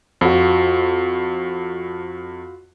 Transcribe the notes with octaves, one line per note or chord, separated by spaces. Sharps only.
F2 F4 F#4